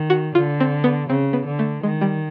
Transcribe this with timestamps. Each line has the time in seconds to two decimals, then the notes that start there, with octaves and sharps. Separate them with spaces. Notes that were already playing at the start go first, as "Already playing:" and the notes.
Already playing: D#3
0.10 F#4
0.35 D3 F4
0.60 C4
0.84 B3
1.09 C#3 C4
1.33 B3
1.46 D3
1.59 A3
1.83 D#3 G#3
2.01 G3